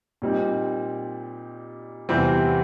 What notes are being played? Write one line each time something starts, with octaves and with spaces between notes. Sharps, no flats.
A#2 G3 C4 D#4
E2 C3 E3 G3 C4